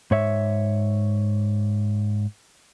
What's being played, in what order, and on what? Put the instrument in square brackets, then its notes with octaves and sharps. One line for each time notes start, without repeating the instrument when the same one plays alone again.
[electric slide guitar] G#2 C#5 E5